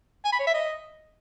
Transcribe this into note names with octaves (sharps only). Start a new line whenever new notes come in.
G#5
B5
C#5
E5
D#5